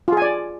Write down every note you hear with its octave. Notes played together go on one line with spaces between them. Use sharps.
F4 G#4 D5 G#5